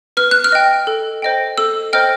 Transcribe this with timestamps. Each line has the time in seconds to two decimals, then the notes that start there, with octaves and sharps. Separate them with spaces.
0.17 B4 F6
0.31 F#6
0.44 F6
0.52 D#5 G5
0.87 A4
1.22 C5 D#5 G5
1.58 A4 E6
1.93 C5 D#5 G5 F6